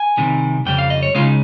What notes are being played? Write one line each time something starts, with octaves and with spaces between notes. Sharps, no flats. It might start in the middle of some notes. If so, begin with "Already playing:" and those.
Already playing: G#5
C2 C3 D#3 G3
F2 C#3 G3 G5
F5
D#5
C#5
C#2 C#3 G#3 F4
D#4